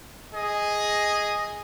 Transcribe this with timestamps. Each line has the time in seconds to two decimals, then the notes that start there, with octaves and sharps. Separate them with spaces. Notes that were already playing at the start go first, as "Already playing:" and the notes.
0.32 G#4 D#5